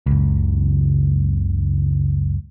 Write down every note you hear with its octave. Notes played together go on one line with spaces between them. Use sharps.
F#1 C#2